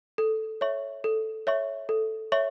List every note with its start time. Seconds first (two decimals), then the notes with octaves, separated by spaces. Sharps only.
0.18 A4
0.61 C#5 E5 C#6
1.04 A4
1.47 C#5 E5 C#6
1.89 A4
2.32 C#5 E5 C#6